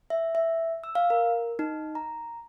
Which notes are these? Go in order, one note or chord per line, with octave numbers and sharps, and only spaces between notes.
E5
E5
E6
F5
A#4
D#4
A#5